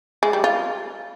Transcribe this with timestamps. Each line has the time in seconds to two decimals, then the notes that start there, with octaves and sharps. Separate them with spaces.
0.23 G#3
0.33 G3
0.44 F4